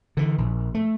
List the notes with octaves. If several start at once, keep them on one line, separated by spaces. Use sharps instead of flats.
D3 E3
A#1
A3